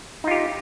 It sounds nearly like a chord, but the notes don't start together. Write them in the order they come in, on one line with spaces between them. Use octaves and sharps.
D#4 F4 G4